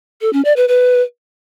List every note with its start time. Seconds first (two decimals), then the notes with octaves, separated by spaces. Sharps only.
0.21 A4
0.33 C#4
0.45 D5
0.56 B4
0.68 B4